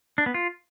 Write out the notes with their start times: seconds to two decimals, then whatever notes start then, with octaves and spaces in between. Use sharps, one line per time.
0.18 D4
0.26 B3
0.34 F4